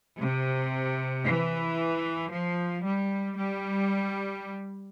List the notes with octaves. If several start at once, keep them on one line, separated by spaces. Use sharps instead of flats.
C3
E3
F3
G3
G3